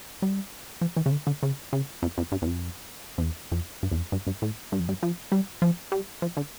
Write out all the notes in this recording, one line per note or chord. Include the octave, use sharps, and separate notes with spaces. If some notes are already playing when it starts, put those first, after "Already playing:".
G3
F3
E3
C#3
D3
D3
C#3
C#3
F2
F2
G2
E2
F2
F2
E2
F2
G2
E2
F2
G2
G2
A2
G2
F2
G2
F3
G3
F3
G3
F3
D3